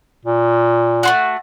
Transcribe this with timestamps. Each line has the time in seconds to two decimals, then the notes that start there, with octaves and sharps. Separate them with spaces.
0.25 A#2
1.03 A3 F4 F#4